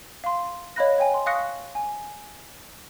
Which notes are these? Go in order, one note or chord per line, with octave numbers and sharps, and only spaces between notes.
F5 C6
C#5 D#5 F5 B5 F#6 A#6
C#5 G5 G#5
C6
F5 C#6 D#6 F#6 A#6 C#7
G#5